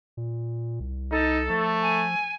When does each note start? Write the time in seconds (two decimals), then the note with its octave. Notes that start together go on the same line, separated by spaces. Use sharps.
0.17 A#2
0.80 C2
1.11 D#4 A4
1.50 F3 A3
1.82 G#5